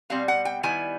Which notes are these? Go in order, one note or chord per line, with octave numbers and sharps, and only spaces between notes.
B2 G3 C4 F5
F#5
G5
D#3 G3 B3 E4 G#5